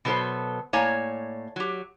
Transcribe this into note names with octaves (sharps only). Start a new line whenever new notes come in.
B2 F#3 B3 A4 C5
A2 A#3 C#5 D5 G#5 A#5
F#3 G4